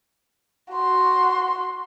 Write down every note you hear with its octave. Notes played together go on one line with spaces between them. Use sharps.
F#4 C6